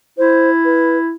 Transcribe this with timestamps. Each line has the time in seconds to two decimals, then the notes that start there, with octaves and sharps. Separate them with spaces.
0.18 E4 C5
0.65 B4